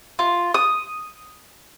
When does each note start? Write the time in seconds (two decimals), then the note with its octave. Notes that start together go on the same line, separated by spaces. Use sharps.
0.19 F4
0.54 D#6